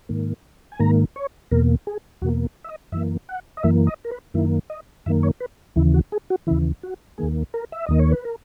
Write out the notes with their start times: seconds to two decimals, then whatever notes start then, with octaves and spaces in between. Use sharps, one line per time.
0.09 G#2 D#3 A#3
0.72 G#5
0.79 G#2 D#3 A#3 A#5
1.16 C#5
1.51 E2 B2 A#3 A#4
1.87 G#4
2.22 E2 B2 A#3 F#4
2.64 E5
2.69 D#5
2.92 F#2 E3 A#3 E5
3.29 F#5
3.57 D#5
3.63 F#2 E3 A#3 E5
3.87 D#5
4.05 A#4
4.11 B4
4.34 F#2 D#3 A#3 E4
4.70 D#5
5.06 F#2 D#3 A#3 E5
5.23 C#5
5.40 B4
5.76 D#2 C#3 E3 E4
5.94 F#4
6.12 G#4
6.30 F#4
6.47 D#2 C#3 E3 E4
6.83 F#4
7.18 D#2 D#3 A#3 G#4
7.54 A#4
7.72 E5
7.86 D#2 D#3 A#3 D#5
7.99 C#5
8.11 B4
8.25 A#4